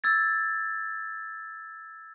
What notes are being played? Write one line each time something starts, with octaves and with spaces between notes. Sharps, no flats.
E6 G#6 A6